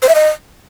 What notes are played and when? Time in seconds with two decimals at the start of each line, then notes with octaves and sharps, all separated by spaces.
0.02 C5
0.09 E5
0.15 D#5